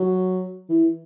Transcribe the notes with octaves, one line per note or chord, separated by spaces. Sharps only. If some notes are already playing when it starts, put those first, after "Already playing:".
Already playing: F#3
E3